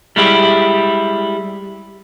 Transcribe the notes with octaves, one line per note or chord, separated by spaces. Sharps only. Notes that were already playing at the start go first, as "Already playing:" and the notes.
G3 G#3 E4 G4